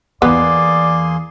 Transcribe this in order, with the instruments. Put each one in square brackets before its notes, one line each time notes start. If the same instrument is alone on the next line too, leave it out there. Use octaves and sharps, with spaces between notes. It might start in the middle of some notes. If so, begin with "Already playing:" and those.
[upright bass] E2 E3 [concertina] A#3 G#4 C6 [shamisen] B3 [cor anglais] D5